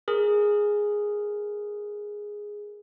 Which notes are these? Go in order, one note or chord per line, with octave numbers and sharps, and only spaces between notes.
G#4 A#4